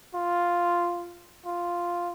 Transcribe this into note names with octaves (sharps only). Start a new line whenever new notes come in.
F4
F4